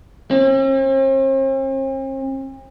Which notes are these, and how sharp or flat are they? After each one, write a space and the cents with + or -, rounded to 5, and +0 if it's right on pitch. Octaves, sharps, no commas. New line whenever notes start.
C4 +45